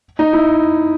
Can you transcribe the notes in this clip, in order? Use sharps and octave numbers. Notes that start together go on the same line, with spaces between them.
D#4
E4